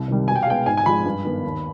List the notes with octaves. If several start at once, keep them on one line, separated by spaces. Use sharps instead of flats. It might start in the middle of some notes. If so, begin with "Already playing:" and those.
Already playing: C2
C3 D#3 G3
B2 G#5
G5
F5
G#3 B3 G5
G#2 G#5
G#5
F3 G#3 B5
G2
D#3 B3
D#2